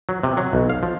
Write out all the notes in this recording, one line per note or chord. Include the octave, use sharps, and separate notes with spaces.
F#3
C3
F#3
B1
F5
F3